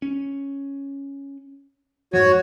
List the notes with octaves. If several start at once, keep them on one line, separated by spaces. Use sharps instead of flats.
C#4
F2 G#2 F3 F#4 C#5